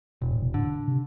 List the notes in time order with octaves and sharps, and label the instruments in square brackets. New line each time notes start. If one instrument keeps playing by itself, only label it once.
[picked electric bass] E1 [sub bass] B2
[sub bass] A2
B2
[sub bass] A2 [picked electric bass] D3
[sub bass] C3